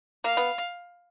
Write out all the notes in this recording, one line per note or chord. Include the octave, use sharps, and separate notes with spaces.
A#3 F5
B3